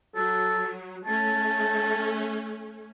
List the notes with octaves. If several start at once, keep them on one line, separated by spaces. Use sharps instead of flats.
F#3 A4
A3 C#4 A5